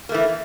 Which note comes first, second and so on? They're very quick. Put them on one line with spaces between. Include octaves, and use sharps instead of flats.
A#3 A3 E3